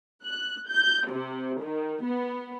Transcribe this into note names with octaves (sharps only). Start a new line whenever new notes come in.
F#6
G6
C3
D#3
B3